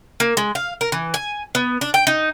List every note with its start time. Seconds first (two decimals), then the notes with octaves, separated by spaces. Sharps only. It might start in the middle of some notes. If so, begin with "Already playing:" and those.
0.20 A#3
0.37 G#3
0.55 F5
0.81 A#4
0.92 E3
1.14 G#5
1.55 B3
1.81 D4
1.94 G5
2.07 D#4